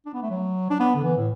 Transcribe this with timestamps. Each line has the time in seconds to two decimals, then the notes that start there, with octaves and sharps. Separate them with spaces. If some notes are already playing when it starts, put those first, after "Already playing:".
0.06 D4
0.14 B3
0.23 A3
0.30 F#3
0.70 D4
0.80 B3
0.95 D3
1.03 E3
1.17 A2